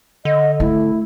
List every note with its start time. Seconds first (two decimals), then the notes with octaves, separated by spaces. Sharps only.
0.25 D3 D#5
0.60 A3 E4